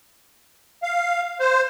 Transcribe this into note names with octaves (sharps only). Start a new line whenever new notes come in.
F5
C5